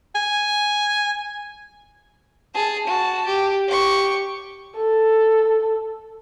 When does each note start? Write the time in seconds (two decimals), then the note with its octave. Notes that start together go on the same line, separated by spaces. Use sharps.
0.15 G#5
2.54 G#4 A5
2.87 F#4 A5
3.26 G4
3.68 G4 C#6
4.77 A4